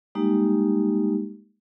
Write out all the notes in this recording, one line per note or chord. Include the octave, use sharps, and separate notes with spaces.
G3 G#3 A#3 D#4 G4